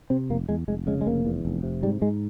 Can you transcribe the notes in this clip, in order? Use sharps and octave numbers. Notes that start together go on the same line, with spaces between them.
C3 C4
F1 A#3
E2 G#3
F1 G#3
C#3 G#3
G#3
F1 A#3
E2
F1
C3
G#2 G3
G#2 G#3